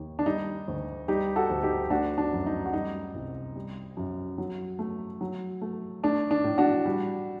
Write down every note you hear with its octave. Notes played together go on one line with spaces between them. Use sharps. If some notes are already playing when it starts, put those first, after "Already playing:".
Already playing: D#2
D4
G3 D#4
D2
G3 D#4 G4
F#4 A4
D2
D#4 G4
A3 D4 F#4
D4
F#2
D#4
F#4
G3 D#4
C2
G3
F#2
F#3
A3
F#3
A3
A3 D4
D4
A2
D4 F#4
G3